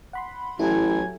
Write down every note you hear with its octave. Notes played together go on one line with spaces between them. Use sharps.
F#5 B5 C6
A1 F#3 E4 G4 A4 G#5